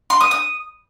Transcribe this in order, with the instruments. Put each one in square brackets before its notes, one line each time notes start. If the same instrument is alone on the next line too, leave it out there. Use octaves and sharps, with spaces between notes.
[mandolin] C6
D#6
D#6